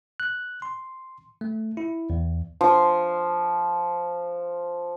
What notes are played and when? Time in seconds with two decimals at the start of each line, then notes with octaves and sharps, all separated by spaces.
0.20 F#6
0.62 C6
1.41 A3
1.77 E4
2.10 E2
2.61 F3 C6